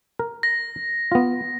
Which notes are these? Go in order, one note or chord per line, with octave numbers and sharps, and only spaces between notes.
A#4
A#6
B3 F4